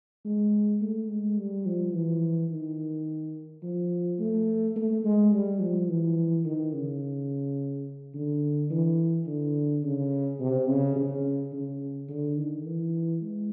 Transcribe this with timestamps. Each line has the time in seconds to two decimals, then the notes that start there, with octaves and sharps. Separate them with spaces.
0.25 G#3
0.81 A3
1.10 G#3
1.38 G3
1.66 F3
1.94 E3
2.50 D#3
3.63 F3
4.20 A3
4.76 A3
5.04 G#3
5.32 G3
5.60 F3
5.89 E3
6.45 D#3
6.73 C#3
8.14 D3
8.71 E3
9.27 D3
9.83 C#3
10.40 C3
10.68 C#3
10.96 C#3
11.52 C#3
12.09 D3
12.37 D#3
12.65 E3
13.21 G#3